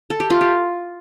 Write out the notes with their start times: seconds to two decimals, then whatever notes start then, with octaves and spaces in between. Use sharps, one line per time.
0.10 A4
0.20 G4
0.30 A3 F4
0.41 G4